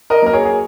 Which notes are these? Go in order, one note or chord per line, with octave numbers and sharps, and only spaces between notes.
A#4 D#5
F#3 A#3 A#4
G#4 C#5
G#4